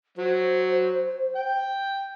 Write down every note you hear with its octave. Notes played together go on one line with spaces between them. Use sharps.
F#3 C5
G5